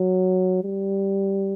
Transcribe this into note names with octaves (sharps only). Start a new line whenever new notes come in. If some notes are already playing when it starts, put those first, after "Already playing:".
Already playing: F#3
G3